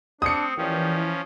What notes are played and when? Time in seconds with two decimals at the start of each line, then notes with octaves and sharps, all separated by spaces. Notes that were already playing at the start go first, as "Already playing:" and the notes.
0.22 C4 D4 D#6 C#7
0.57 D#2 E3 F3 C#4 D5 G5